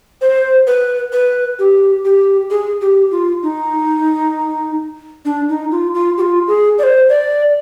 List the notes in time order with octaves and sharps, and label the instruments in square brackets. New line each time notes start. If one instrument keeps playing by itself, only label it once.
[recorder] C5
B4
B4
G4
G4
G#4
G4
F4
D#4
D4
D#4
F4
F4
G4
F4
G#4
D5
C5
D5